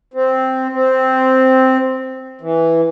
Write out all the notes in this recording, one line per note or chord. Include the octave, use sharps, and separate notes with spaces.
C4
C4
E3